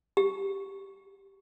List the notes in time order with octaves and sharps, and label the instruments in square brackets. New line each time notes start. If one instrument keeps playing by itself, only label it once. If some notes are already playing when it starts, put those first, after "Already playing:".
[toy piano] G4